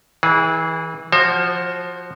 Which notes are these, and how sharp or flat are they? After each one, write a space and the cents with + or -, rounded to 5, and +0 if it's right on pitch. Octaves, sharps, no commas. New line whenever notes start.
E3 -30 G#4 +0
F3 +0 F#4 +0 C5 +35